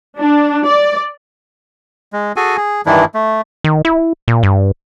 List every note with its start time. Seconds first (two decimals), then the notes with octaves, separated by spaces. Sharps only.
0.18 D4
0.66 D5
2.13 G#3
2.36 F#4 G#4 A4 G#5
2.57 G#4
2.86 G2 D#3 E3 D4 E4
3.14 A3
3.64 D#3
3.85 E4
4.28 A#2
4.43 G2